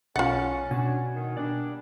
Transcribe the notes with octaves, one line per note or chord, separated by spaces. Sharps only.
B1 C#4 F4 F#5 A6 C#7
B2 C#4 D4 F#4 G#5
D#3
A#2 G3 D4 D5